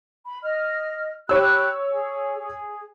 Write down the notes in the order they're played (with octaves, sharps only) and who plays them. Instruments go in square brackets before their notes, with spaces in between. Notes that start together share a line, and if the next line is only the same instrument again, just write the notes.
[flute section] B5
D#5 F6
[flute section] G4 B5 F#6 [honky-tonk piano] C#5 E6
[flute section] G#4
G#4